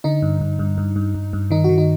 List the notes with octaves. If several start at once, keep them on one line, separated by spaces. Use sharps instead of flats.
D3 D#4
G2
G2
G2
G2
G2
G2
G2
D#3 D#4
D#3 F#4
D#4